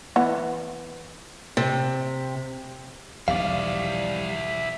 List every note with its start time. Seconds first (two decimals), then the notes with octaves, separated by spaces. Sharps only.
0.16 E3 B3
1.57 C3
3.28 E1 B1 C3 F3 G3 E4 D5 F5